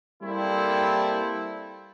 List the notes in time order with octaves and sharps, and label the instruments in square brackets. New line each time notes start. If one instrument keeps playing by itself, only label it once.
[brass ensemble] G3 A#3 C4 E4 A4